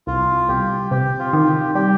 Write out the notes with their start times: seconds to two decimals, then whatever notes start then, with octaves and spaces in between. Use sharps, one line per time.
0.07 C2 F4
0.49 C2 G4
0.91 C3 G4
1.19 F4
1.33 D#3
1.46 G4
1.75 G3 G4